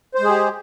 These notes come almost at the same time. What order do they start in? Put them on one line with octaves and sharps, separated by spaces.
C5 G#3 G#4 G4